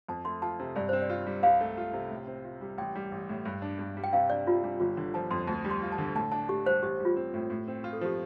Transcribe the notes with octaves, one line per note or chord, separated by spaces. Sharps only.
F2 A5
A3 C6
F4 A5
C3
G2 D5
C4 C5
D5
F4
G3
C2 F5
A3
F4
C3
A2
C4
F4
G3
A1 G5
G3
A1
A2
G2
D4
G2
G3
G5
C3 F5
D4 D5
C3 F4
G3 D4
G1 F4
D3
F3 A5
F2 C6
D2 A5
G3
C6
F4
A5
D3
A2 A5
D4 A5
A2 G4
G3 C5
A1 G4
G3
F4
C4
A2
A2
C4
F4
A4
F3 G4